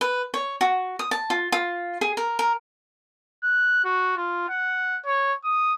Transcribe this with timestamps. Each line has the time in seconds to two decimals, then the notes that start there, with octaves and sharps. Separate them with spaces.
0.01 B4
0.34 C#5
0.61 F#4
0.99 D#6
1.11 A5
1.30 F4
1.52 F4
2.01 G#4
2.17 A#4
2.39 A#4
3.43 F#6
3.85 F#4
4.17 F4
4.49 F#5
5.05 C#5
5.44 D#6